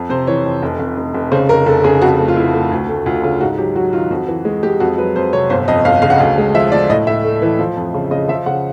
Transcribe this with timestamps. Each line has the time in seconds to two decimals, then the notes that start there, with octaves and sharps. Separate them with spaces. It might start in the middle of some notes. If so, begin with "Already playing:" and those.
Already playing: F2
0.09 C3 C5
0.27 E3 C#5
0.45 F2
0.63 F1
0.79 F1
0.98 F1
1.14 F1
1.32 C#3 C5
1.49 F1 A#4
1.66 F1 A4
1.84 C#3 G#4
2.02 F2 F#4
2.18 A3
2.28 F4
2.36 A3 E4
2.54 A3
2.71 D2
2.89 A3
3.06 D2 F4
3.23 C#3 F4
3.40 G#2 F#4
3.58 F#3 G4
3.76 F#3 F#4
3.93 D#3 F4
4.11 F2 F#4
4.28 E3
4.45 G#3
4.63 G#3 G4
4.80 F2 F#4
4.98 F#3 B4
5.15 F2 C5
5.33 C3 C#5
5.50 G1 C5
5.68 F2 D#5
5.85 G1 F5
6.02 C#3 F5
6.10 F#5
6.18 D2 F5
6.38 G#3
6.54 F3 E5
6.72 F3 D5
6.90 A2 D#5
7.07 A2 E5
7.25 A3
7.42 E3
7.59 F3
7.77 F2
7.94 C#3
8.11 C#3 D#5
8.28 F3 E5
8.46 C#3 F#5